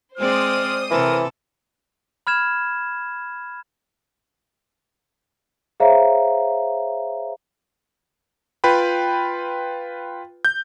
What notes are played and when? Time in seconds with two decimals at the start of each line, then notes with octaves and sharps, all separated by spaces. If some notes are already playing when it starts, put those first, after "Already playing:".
0.18 G#3 C4 C5 D5 D#6 F6
0.91 C3 E3 A4 A#4
2.27 B5 F6 G#6 E7
5.80 G#4 C5 C#5 E5 F5 A#5
8.64 F4 B4 G5 B5
10.45 G6